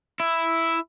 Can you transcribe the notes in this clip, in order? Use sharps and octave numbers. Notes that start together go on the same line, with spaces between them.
E4